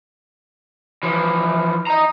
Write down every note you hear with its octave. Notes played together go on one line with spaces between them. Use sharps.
E3 F3
D#5 A#5